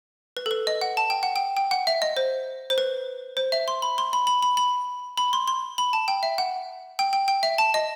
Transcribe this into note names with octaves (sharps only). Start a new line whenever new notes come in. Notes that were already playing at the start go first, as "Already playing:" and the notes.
B4
A4
B4
D#5
F#5
A5
G5
F#5
G5
G5
F#5
E5
D#5
C5
C5
B4
C5
E5
C6
B5
C6
B5
B5
B5
B5
B5
C6
C6
B5
A5
G5
E5
F#5
G5
G5
G5
E5
A5
D#5